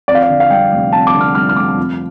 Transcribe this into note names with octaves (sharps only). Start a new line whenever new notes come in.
F2 D5
F5
D5
D3
F5
G3 G5
F1
F2 A5
D6
D3
F6
G3 F6
F6
F1 D6
F2